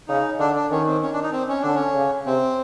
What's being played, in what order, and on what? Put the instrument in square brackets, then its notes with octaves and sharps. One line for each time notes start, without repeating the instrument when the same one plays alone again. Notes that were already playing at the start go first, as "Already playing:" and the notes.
[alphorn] C#3 [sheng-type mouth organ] D#4
[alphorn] D3 [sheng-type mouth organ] D4
[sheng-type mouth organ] D4
[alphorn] D#3 [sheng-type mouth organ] C#4
[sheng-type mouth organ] C4
C#4
D4
D#4
C4
C#4
[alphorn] D3 [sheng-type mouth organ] D4
[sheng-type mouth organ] C#4
[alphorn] C#3
[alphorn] C3 [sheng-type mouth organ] C4